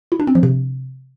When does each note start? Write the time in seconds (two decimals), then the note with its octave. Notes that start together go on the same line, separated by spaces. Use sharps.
0.12 E4
0.20 D4
0.27 C4
0.35 F3
0.43 C3